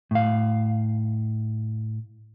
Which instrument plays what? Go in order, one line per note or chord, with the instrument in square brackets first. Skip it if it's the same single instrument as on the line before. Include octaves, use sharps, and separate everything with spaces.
[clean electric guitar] A2 F5